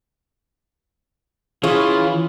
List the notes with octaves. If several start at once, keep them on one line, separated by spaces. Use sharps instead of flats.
E3 C#4 F4 G#4